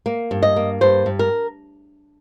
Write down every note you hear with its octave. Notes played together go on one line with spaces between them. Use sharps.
A#3
G2
D#5
A#3
G2 C5
G2
A#4